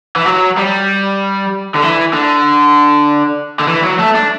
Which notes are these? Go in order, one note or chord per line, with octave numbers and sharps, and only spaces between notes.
E3
F#3
G3
D3
E3
D3
D3
E3
F#3
A3
D4